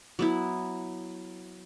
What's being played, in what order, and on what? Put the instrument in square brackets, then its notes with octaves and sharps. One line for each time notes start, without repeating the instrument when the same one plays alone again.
[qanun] F#3 B3 E4